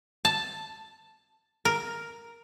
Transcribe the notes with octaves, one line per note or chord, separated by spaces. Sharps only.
A5
A#4